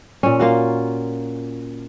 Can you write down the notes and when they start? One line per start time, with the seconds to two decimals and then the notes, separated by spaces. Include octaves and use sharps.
0.23 A#2 C#4
0.39 A#3 F4 F#4